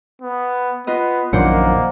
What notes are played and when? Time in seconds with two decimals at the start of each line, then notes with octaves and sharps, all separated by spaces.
0.22 B3
0.87 B3 F4 B4 D#5
1.33 A#1 F#2 D#3 A#3 C5 D5 F#5